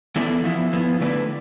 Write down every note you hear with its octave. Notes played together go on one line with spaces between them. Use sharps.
E3 B3 E4 A4 D5
F3 B3 E4
F3 B3 E4
D3 A3 E4 B4 D5